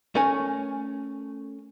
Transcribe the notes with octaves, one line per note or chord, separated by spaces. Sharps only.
A3 C#4 A#4 C#5 G#5